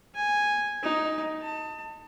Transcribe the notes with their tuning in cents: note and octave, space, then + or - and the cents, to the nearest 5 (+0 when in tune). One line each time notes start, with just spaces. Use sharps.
G#5 -5
D#4 +10
A5 +30